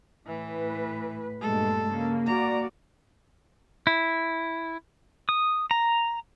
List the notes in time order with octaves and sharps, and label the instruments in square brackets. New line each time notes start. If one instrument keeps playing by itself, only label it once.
[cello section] A2 B4 [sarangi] E3
[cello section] G2 A#2 G#3 [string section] A3 [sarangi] A4
[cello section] C#3 [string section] A#3
[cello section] F#4 D5 [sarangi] A#5
[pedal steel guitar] E4
D#6
A#5